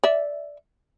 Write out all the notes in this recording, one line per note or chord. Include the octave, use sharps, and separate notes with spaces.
D5 E5